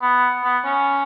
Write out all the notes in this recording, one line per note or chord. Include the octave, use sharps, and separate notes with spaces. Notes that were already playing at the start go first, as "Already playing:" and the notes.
B3
B3
C#4